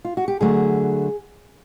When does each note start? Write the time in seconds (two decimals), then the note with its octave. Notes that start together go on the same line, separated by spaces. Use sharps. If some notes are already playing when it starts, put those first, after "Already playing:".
0.05 F4
0.17 F#4
0.28 G4
0.41 D3 F#3 A3 G#4